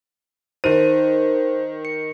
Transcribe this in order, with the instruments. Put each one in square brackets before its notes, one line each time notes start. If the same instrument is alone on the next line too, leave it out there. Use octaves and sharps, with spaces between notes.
[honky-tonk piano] D#3 D#7 [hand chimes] D#4 C5
[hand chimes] C#7